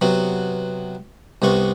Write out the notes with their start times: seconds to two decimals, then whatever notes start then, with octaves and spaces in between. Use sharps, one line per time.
0.01 C3 F#3 B3
1.42 C2 C3 B3 C#6